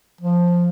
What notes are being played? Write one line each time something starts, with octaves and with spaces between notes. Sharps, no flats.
F3